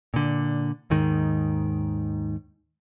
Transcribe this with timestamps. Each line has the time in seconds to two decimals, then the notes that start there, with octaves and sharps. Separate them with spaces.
0.14 A#2 D3
0.90 D#2 G#2 D#3